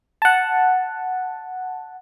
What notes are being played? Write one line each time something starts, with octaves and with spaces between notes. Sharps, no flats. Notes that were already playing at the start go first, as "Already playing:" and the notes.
F#5 A5